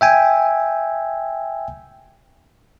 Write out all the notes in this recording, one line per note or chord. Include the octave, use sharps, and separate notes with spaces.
E5 G5 G#5